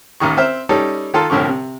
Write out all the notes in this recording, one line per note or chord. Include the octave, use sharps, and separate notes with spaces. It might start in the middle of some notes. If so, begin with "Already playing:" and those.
A1 D#2 D#3 C#6
C4 C5 E5 F6
G3 C#4 D#4 A4
D#3 F4 A4
C2 A2 D3 F3 C#6
C3